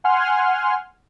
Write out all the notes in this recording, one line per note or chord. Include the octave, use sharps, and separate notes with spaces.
F#5 G#5 C6 F6